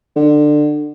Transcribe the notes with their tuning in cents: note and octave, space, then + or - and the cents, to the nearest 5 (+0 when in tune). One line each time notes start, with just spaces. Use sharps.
D3 +20